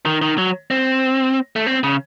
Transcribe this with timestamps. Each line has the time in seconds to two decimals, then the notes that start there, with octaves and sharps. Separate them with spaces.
0.06 D#3
0.22 D#3
0.38 F#3
0.71 C4
1.56 A3
1.67 C4
1.84 C#3